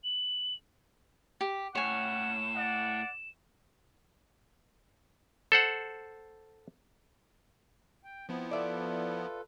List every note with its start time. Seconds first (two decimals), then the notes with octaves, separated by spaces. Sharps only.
0.04 F#7
1.41 G4
1.75 A2 G3 C#4 C#5 F#5 G#5 E7
2.56 D5 F#5
5.52 A4 C5 F#5
8.04 G5
8.29 F3 B3 C4 E4
8.51 F4 A4 B4 D5 E5